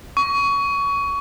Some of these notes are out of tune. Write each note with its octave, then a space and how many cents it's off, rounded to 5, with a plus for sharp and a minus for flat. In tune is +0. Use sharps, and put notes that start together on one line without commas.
C#6 +25